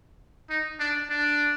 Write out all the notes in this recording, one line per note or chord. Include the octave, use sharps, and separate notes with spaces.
D#4
D4
D4